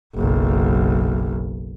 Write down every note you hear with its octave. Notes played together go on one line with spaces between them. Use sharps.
F#1 B1